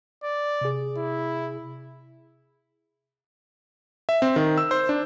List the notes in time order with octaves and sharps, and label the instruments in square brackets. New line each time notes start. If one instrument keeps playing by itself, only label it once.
[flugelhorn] D5
[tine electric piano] C3 G#4
[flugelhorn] E4
[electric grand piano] E5
C4
D#3
E6
C5
D4